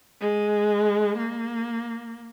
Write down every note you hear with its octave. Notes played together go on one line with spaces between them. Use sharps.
G#3
A#3